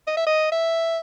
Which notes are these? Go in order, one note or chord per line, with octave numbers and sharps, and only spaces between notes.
D#5
E5
D#5
E5